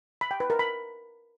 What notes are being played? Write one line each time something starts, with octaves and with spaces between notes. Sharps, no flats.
B5
G5
B4
A#4
B5